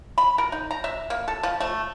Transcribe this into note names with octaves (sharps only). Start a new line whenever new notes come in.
B5
A#4
D#4
A#5
E5
A#3
A4
F3
A3